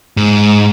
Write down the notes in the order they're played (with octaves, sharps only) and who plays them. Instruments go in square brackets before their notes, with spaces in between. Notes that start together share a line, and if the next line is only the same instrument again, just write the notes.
[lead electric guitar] G#2